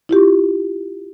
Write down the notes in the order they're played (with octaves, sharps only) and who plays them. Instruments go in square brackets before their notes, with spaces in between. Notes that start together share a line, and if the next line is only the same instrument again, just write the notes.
[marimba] E4 F4 G4